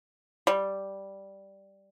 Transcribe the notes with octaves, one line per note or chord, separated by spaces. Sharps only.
G3